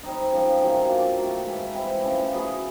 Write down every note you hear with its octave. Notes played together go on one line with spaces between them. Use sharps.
G3 C4 D#4
C#3 F3 G#3 C4
C3 D#3 F#3
F#3 A#3 D4 F4
D#3 F#3 A3
G#2 E3 G#3
G3 C4 E4
C#3 F3 A3 C#4
F#3 B3 E4 G#4